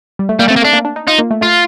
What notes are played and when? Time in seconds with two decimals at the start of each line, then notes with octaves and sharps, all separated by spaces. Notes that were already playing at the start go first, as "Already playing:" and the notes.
0.19 G3
0.29 A3
0.39 G3 A#3
0.48 A3 C4
0.56 A#3
0.62 A3
0.64 D4
0.73 A#3
0.85 D4
0.96 D#4
1.07 D#4 F4
1.18 A#3
1.31 A3
1.41 A3 F4